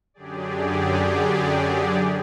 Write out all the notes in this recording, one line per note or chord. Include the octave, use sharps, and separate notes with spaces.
F#2 D3 F#3 G4 G#4 D5